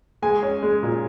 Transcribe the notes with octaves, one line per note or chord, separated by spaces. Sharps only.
G#3 G#5
C#4
G#3
A#2